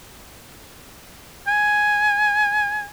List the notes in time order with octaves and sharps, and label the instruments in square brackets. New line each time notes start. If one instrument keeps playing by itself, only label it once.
[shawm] G#5